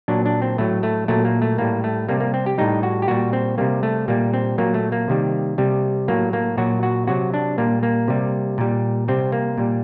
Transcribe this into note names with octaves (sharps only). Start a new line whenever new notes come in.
A#2 F#3 D4
D4
C4
A2 F#3 A3
A3
A#2 F#3 A3
A#3
A3
A2 G3 A#3
A3
C3 G3 A#3
A#3
C4
G4
A2 G3 D#4
F#4
G4
A#2 G3 F#4
C4
C3 G3 A#3
A3
A#2 G3 A#3
C4
A#2 F#3 A#3
A3
A#3
C3 D#3 G3
C3 G3
A2 F#3 A#3
A#3
A#2 F#3 F#4
F#4
C3 F#3 F#4
D4
A#2 G3 A#3
A#3
C3 G3
A#2 G3
C3 G3 C4
A#3
A#2 G3